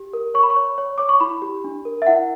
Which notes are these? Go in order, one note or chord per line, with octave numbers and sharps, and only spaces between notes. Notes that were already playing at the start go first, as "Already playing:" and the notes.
Already playing: G4
A#4
C#5 C#6
B5
C#6
C#5
C#5
C#5 D6
C#6
E4 B5
G4
D4
A#4
E5
E4 F#5